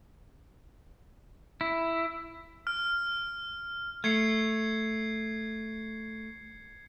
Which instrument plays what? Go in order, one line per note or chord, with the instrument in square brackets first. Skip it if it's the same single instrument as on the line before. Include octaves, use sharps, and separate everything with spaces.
[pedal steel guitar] E4
[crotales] F6
[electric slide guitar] A3 [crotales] G#6 C7 C#7